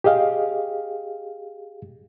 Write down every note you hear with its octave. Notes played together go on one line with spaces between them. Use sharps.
G4 G#4 D#5 F5